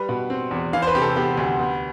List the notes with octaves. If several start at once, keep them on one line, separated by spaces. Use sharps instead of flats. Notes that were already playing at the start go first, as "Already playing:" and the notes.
Already playing: G3 B4
B2
C4
E2
E3 F5
C5
B4
C3 G4
A4
B3 G4
D2
B3